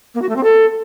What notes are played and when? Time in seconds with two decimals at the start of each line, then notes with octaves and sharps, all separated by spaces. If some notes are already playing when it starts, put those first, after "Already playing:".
0.15 A#3
0.22 F#4
0.29 A3
0.36 C4
0.44 A4